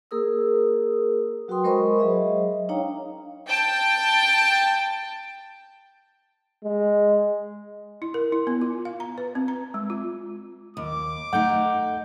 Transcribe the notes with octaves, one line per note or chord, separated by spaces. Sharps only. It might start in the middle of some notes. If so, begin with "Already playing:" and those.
A#3 G#4 A#4 D#6 E6
F#3 F#4 B4 G5 C6 D#6
G#3 A#4 C5 D#5 B5 C#6
F#3 G#4 D#5 E5
D4 D#4 C#5 F5 G5 A#5
G5 A5
G#3
E4
A#4
E4
B3
F4
F5
A#5
B4
C4
A#5
G#3
F4
D#2 D6
A3 D#4 F#5 G6